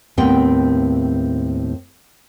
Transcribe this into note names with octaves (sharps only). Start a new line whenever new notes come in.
D#2 A2 B3 C4 G5